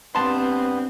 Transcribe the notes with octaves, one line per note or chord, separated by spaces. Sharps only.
G2 B3 C4 A5 C6